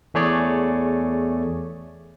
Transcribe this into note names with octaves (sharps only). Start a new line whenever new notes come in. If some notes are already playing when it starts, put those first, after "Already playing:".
E2 A3 G#4 C#5 D5